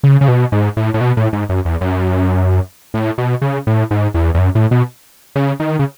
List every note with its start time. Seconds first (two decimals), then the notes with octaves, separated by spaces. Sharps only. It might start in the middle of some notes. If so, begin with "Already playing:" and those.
0.03 C#3
0.21 C#3
0.28 B2
0.52 G#2
0.77 A2
0.94 A2
1.01 B2
1.17 A2
1.33 G#2
1.49 F#2
1.65 E2
1.81 F#2
2.94 A2
3.18 B2
3.42 C#3
3.67 A2
3.91 G#2
4.14 E2
4.35 E2
4.38 F#2
4.55 A2
4.71 B2
5.36 C#3
5.60 D#3
5.79 C#3